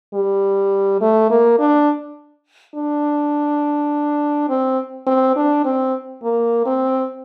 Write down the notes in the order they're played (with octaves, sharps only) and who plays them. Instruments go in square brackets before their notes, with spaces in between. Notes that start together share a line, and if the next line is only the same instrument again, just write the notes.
[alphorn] G3
A3
A#3
D4
D4
C4
C4
D4
C4
A#3
C4